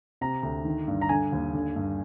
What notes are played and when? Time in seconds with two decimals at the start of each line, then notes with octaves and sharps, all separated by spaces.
0.21 C3 A#5
0.43 D2
0.65 D#3
0.88 G2
1.01 A#5
1.09 D3 G#5
1.32 D#2
1.54 D3
1.76 G2